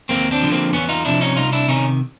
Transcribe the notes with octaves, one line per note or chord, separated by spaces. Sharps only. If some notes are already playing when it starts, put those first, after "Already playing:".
D#2 A#3 C4
C4 D4
D3 F3
A#3 C4
E2 B3 C#4
D#4 F4
C3 F3 D4 E4
C#4 D#4
C2 D#4 F4
D4 E4
C3 D#3 C#4 D#4